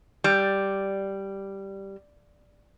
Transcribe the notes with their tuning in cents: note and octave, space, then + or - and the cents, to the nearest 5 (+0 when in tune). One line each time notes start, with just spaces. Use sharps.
G3 -5